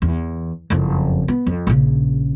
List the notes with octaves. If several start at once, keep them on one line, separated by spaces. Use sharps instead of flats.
E2
F#1 F2
B3
F2
A#1 C#3